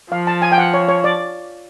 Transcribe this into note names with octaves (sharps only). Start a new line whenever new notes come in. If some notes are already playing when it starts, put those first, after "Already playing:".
F3 F5
A5
G#5
G5
F#5
C#5
C#5
D5